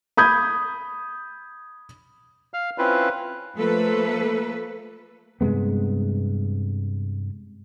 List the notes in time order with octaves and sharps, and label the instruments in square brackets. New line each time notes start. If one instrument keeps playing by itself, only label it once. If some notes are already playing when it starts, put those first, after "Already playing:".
[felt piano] B5 D#6 G6 G#6
[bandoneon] F5 F6
C4 C#4 E4 F4 B4
[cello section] F3 A3 A#3 A4 B4
[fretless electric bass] G2 C3 G#3 B3